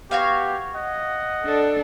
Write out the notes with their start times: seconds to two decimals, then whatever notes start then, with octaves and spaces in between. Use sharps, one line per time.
0.11 B3 F#4 G4 C#5 F5
0.76 D#5 F#5
1.43 D4 A4